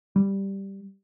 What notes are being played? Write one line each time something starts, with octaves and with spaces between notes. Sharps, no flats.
G3